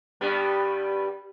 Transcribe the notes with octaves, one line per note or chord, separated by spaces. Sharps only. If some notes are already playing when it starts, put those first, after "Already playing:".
G2 G3 B3